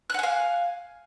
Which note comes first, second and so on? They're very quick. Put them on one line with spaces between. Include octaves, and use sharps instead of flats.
F#6 F#5 G#5 F5